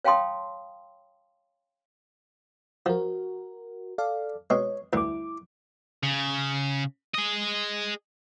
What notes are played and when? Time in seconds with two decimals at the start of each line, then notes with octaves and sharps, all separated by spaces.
0.05 C#5 F5 G5 A5 C6 D#6
2.86 F3 F#4 A#4
3.98 A4 D5 F5
4.50 B2 G#3 C#5
4.93 D2 G2 D3 E4 D6
6.03 C#3
7.15 G#4 D#5